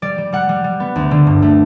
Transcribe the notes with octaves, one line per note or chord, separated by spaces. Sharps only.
G3 D5
G3
G3 F#5
G3
G3
B3
D2
D3
G2
A3